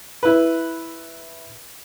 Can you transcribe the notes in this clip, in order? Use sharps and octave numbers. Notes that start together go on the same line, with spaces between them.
E4 B4